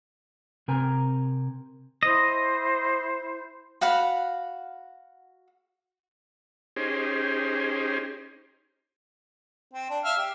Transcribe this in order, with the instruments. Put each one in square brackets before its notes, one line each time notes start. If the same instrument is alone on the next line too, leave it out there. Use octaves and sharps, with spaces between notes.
[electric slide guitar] C3 C4 A#4 G#5
[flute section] E4 C5 [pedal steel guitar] D#5
[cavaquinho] F#4 F5 F#5 B5
[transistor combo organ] C#4 D#4 G4 G#4 C5
[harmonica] C4
D4
E5 F5 F6
G4